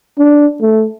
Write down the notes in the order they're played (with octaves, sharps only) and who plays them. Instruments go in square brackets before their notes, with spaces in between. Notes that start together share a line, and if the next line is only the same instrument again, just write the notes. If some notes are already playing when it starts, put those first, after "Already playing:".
[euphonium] D4
A3